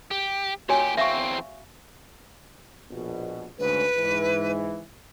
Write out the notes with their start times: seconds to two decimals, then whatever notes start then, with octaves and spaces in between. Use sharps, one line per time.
0.11 G4
0.69 A#2 F#4 G4 C#5 G#5
0.97 E2 C4 E5 F5 C#6
2.91 A#1 B2
3.59 D2 G#2 C#3 B4
3.97 G#2 E3